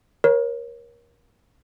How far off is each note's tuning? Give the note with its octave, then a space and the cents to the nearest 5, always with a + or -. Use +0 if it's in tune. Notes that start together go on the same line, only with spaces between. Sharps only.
A#4 +30 C#5 -20